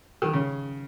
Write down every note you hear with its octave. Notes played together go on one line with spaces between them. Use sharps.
D#3
C#3